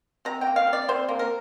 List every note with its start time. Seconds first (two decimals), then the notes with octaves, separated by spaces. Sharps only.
0.25 C3 A#5
0.41 G5
0.47 A#3
0.56 F5
0.67 C3
0.73 D5
0.88 C3 C5
1.09 A#3
1.19 A#4